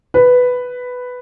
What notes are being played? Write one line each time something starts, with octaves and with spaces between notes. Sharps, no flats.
B4